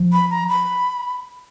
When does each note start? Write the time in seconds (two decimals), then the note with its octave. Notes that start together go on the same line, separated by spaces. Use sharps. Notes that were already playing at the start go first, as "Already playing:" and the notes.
Already playing: F3
0.13 B5
0.31 A#5
0.49 B5